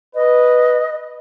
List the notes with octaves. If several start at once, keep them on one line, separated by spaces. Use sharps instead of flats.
B4 D#5